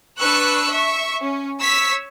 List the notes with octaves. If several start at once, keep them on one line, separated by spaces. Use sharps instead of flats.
D4 B4 C#6 E6 F#6
E5 C#6
C#4
C#5 E6 B6